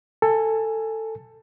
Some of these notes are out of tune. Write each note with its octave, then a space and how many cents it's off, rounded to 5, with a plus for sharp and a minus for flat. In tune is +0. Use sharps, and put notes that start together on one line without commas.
A4 +15 G#5 +0